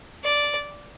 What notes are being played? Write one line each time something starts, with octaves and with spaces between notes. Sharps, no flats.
D5